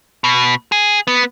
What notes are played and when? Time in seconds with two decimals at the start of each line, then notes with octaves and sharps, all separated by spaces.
0.24 B2
0.72 G#4
1.07 B3